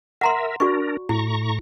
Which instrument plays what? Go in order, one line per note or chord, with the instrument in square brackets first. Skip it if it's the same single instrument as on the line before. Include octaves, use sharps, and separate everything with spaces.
[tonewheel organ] A#4 E5 [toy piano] F#5 A#5 C6
[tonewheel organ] D4 A#4 [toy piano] F#4 D5 C#6
[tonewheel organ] A2 A#5 C#6 [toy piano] E4